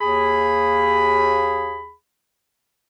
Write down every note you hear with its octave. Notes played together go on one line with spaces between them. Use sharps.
D#2 G#4 B5